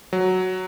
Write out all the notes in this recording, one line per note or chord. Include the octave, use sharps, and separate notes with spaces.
F#3